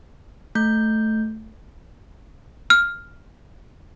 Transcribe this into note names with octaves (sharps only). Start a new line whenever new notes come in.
A3 G6
F6